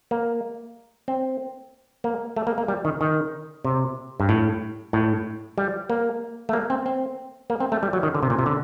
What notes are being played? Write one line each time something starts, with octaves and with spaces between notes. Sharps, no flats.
A#3
C4
A#3
A3
A#3
A#3
G3
D#3
D#3
C3
G2
A2
A2
G3
A#3
A3
A#3
C4
C4
A#3
C4
A3
G3
F#3
D#3
D3
C3
A#2
C3
D3